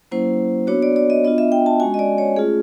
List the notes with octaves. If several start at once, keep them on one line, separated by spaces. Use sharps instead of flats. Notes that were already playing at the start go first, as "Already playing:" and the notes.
F#3 A#3 C#4 E4 C5
B3 D4 F#4 C#5
D5
D5
D#5
B3 D4 F4 D#5
E5
G5
A5
G#3 C#4 F#4 G#5
D#5
D5
C#5
A3 C#4 F4 G#4